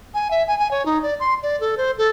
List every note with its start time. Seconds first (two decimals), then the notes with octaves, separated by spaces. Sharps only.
0.14 G#5
0.31 E5
0.47 G#5
0.59 G#5
0.71 C#5
0.86 D#4
1.03 D5
1.20 C6
1.43 D5
1.60 A4
1.77 C5
1.98 A4